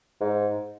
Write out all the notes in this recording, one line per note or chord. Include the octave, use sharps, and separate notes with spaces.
G#2